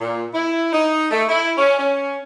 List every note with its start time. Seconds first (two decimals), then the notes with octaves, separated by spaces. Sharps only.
0.01 A#2
0.34 E4
0.73 D#4
1.11 A3
1.29 E4
1.57 C#4
1.79 C#4